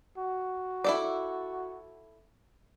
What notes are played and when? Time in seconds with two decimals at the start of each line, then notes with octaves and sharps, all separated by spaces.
0.17 F#4
0.84 E4 A4 D5